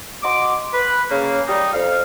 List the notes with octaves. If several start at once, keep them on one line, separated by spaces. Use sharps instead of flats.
F#4 D#5 C6 D6
B4
C#3 A#3
G3 D#4
F2 F5